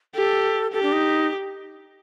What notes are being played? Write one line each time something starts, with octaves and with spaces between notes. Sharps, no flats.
G4 A4
G4 A4
D4
D#4